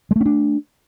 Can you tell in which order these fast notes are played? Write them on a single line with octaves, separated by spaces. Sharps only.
G#3 A3 C#4 D4